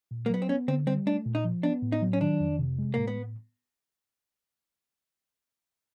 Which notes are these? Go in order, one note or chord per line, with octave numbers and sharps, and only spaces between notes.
A#2
A#3
F#3 B3
C4
B3 C#4
D3 C4
G3 C4
A3 D4
A#2
D#4
F3
B3 D4
A2
D#4
F#3
C#4
D#3 D4
F2
C3
G#3
A2 A#3
B3